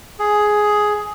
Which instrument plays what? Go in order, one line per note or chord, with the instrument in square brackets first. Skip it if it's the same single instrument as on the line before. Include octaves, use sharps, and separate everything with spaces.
[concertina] G#4